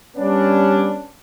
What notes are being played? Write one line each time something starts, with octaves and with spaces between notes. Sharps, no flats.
G3 B3 C#4 D4